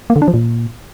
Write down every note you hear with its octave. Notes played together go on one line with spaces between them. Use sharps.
A#3
D3
D4
F3
A#2